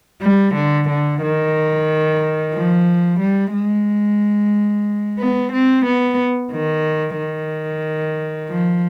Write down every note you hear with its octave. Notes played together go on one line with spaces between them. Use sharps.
G3
D3
D3
D#3
F3
G3
G#3
B3
C4
B3
D#3
D#3
F3